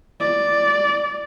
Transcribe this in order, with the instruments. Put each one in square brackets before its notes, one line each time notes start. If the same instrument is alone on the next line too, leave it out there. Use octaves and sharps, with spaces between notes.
[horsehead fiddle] D5